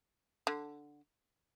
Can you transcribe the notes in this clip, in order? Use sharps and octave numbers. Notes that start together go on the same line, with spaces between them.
D3